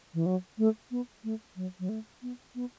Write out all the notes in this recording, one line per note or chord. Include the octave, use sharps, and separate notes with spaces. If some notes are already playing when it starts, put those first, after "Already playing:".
E3
F#3
A3
B3
A3
F#3
F#3
A3
B3
B3